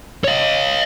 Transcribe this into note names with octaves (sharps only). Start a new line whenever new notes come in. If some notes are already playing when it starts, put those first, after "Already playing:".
C#5 D#5